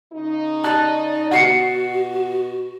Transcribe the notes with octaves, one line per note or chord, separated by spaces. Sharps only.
C#3 D#4
D5 A5 F#6
B2 F#4 F#5 C7 C#7